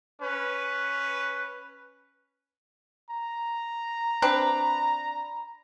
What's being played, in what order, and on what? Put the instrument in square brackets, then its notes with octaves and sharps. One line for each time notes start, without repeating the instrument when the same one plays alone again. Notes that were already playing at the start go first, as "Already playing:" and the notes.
[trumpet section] C#4 B4
[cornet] A#5
[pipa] C4 D4 B4